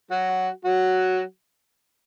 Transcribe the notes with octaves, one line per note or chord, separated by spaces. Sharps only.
F#3 F#4
F#3 F#4